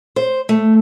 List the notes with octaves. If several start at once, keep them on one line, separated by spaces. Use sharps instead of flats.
C5
A3